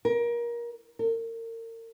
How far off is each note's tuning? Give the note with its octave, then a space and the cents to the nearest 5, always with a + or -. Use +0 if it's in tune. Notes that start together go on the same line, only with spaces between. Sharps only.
A#4 +25
A#4 -35